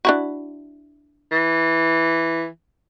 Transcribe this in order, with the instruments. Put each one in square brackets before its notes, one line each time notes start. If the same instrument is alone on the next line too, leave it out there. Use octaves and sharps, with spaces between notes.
[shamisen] D4 E4 F#4
[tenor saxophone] E3